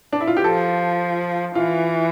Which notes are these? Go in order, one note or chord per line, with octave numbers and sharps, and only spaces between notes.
D4
E4
F4
G4
F3 A4
E3 F4